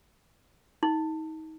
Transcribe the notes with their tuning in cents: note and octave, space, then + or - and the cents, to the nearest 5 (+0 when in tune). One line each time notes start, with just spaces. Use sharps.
D#4 +30